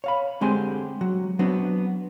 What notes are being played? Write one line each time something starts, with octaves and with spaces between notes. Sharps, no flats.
C#5 F5 B5
D3 G#3 C4 G4 G#5 C6
F#3 F#4
F#3 B3 C4 D4 F#4